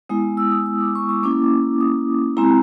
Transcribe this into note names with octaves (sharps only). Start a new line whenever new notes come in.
G#3 B3 E4 D#6
E6
D#6
D#6
D6
C#6
C#6
A#3 C#4 E4 D6
D#6
G#3 C4 E4 A#5